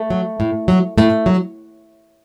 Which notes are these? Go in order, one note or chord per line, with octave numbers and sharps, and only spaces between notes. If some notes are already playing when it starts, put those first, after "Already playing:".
Already playing: A3
F#3
A2
F#3
A2 A3
F#3